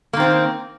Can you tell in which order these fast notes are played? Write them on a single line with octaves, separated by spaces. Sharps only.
A#3 D#3 C4